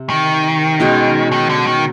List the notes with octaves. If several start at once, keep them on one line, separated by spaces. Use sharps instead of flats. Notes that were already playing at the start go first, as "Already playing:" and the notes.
Already playing: C3
D#3
B2 G#3 C#4
D#3
D3
D#3